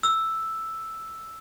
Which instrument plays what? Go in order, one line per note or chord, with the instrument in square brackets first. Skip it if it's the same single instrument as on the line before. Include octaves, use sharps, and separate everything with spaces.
[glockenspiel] E6